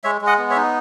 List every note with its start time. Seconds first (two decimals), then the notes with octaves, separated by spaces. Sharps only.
0.04 G#3 C#5 E5
0.21 G#3
0.27 D#5 F#5
0.38 B3
0.50 C#5 E5
0.56 D#4